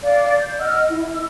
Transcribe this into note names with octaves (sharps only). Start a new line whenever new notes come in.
D5 F5
G6
D#5 F#5 E6 F6
E4
E6